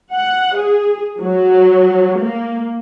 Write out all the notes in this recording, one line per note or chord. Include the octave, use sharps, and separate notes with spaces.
F#5
G#4
F#3
A#3